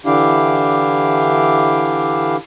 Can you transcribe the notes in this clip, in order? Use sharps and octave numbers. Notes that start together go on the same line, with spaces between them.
D3 E3 D4 E4 G4 F5